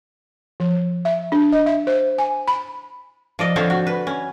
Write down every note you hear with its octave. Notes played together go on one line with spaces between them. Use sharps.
F3
E5
D4
D#5
E5
C5
G#5
B5
F3 D5 D#5
D3 F3 C4 C5 C#5
F#4
B4
C#4